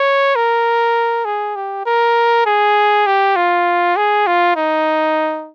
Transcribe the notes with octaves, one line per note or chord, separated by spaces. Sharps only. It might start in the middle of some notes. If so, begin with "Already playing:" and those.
Already playing: C#5
A#4
G#4
G4
A#4
G#4
G4
F4
G#4
F4
D#4